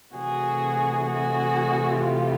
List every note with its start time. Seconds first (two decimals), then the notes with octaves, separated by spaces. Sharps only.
0.15 C3 E3 A3 F#4 G#4
1.05 F#4 G#4
1.96 F4 G4